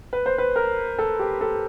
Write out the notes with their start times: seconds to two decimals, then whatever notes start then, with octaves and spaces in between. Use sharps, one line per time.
0.13 B4
0.26 C5
0.38 B4
0.56 A#4
0.98 A4
1.19 G4
1.41 A4